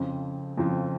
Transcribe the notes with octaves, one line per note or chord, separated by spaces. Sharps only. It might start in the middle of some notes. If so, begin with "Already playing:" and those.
Already playing: F2 C#3 F3 C4
F2 C#3 F3 C4